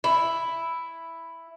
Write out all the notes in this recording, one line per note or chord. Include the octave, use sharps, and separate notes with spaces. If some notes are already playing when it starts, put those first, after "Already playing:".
E4